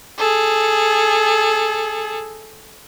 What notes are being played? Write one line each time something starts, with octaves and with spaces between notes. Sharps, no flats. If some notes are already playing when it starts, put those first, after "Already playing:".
G#4 A4